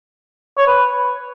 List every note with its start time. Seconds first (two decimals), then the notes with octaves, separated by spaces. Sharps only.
0.57 C#5
0.67 B4